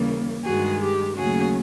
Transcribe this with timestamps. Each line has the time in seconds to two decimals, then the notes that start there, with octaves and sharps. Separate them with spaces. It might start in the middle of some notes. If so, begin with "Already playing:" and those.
Already playing: D#2 C#3 E3 G3 A#3
0.43 G2 D#3 G#3 F#4 G#4
0.80 G4
1.16 D#2 C#3 F#3 A3 C#4 F#4 G#4